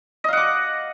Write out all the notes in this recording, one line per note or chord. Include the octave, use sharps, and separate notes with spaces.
D#5 F5 F#5 D6